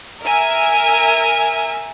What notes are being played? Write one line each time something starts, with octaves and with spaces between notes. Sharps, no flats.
A#4 E5 G#5